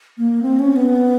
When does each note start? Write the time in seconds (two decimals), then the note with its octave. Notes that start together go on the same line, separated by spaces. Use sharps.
0.18 A#3
0.42 C4
0.59 C#4
0.76 B3